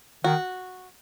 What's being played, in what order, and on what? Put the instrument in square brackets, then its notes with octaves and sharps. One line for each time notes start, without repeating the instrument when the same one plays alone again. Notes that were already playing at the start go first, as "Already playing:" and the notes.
[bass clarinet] D#3 [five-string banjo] F#4